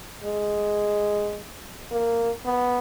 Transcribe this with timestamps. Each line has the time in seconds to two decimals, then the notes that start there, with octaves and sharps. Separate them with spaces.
0.24 G#3
1.91 A#3
2.46 B3